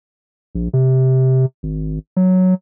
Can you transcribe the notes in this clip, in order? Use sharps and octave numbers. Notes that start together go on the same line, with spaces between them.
A#1
C3
G#1
F#3